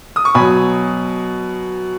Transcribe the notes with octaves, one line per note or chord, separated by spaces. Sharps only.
D#6
C#6
B2 F#3 G#5 B5